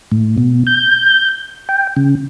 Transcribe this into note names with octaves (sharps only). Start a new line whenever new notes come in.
A2
B2
G6
G5
C#3